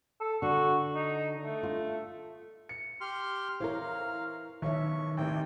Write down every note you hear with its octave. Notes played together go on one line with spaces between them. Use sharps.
A4
D3 F#4
D#4
A3
F4
C#7
G4 C6 F6
E3 A#4 C5 C#5 F5 A#5
B1 D#3 C#5 E5 C#6
A1 D#2 C3 G5